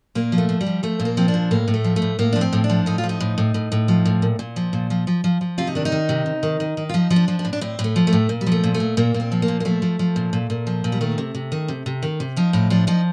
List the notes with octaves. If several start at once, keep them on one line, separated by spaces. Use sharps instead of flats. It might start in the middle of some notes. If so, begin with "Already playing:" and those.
A#2 A#3
F3
A3
F3
G3
F3
F3 A3
A#2
A#3
F3 C4
D4
A#2
A2 A#3
A2
A3
F3
A3
A2
A2 A#3
F3 D4
C4
A2
D4
F3
A2 D#4
F4
F3
D#4
A2
A2
A2
A2
F3
A2
A#2
A#2
F3
A#2
F3
F3
F3
F3
C3 F4
D#4
D#3 D4
D#4
D#3
C3
C3
D#3
D#3
D#3
F4
F3 D#4
F3
D4
F3
D4
A2
D4
A2 C4
A2
A3
F3
A3
A2
A#2
G3
F3
A3
A#2
A3
A#2
A#2 A#3
A#2
C4
F3
A#3
A#2
A#3
F3 A3
F3
F3
A#2
A#2
A#2
F3
A#2
G3
D#3 A3
C3
C3
D#3
C3
C3
D#3
C3
F3 D#4
A2 D#4
F3 D4
F3 D#4